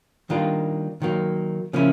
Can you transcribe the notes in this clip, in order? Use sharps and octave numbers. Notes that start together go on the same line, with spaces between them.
D#3 G3 A#3 D4 F4
D#3 F#3 A#3
C#3 F3 A#3 C#4 E4